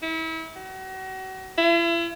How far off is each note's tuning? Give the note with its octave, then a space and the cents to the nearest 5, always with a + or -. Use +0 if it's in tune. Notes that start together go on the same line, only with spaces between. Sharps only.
E4 -35
F#4 +35
E4 +40